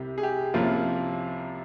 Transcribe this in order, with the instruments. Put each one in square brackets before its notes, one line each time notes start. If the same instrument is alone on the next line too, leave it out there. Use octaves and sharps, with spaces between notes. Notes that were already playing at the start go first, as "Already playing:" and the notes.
Already playing: [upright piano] C2 C3 G3 G4
G#4
G4
C2 C3 F3 A#3 C#4 F4